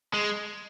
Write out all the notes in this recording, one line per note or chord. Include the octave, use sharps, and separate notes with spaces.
G#3